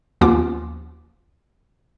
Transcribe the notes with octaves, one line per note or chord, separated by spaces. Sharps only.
D#2 F3 B3 C#4 F4 D6